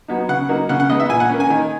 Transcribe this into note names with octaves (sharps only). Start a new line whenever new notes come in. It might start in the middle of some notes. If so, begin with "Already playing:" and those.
F#3 B3 D#4
C#3 F#5
F#3 A#3 D#4
C#3 F#5
F#5
G#3 B3 D#4 D#5
E5
A#2 G#5
F#5
A#3 C#4
G#5
D#3